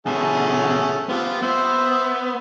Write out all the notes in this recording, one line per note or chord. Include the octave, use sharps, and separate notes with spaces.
B2 D3 A3 C#4 G#4
B3 C4 F4 G4
B3 C5 E5